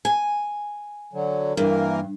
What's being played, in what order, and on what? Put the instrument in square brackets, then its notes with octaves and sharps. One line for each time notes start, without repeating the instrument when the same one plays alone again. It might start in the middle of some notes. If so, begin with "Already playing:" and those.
[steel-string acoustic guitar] G#5
[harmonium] D3 F#3
[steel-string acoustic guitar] G2 [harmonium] E3 A#3 A#4